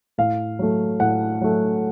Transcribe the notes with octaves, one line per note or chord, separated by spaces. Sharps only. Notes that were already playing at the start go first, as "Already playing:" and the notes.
A2 F5
F#3 A3
A2 F#5
F#3 A3